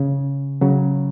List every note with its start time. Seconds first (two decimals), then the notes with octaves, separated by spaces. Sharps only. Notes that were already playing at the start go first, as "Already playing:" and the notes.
Already playing: C#3
0.61 C#3 F#3